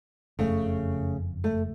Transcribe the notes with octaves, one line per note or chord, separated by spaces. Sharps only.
F#1 F2 C#3 A3
A3